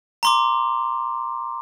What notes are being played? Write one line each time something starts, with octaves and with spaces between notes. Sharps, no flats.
A#5 C6 D6